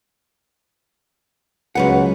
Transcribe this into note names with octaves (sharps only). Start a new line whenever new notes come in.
C#2 F#3 B4 F#5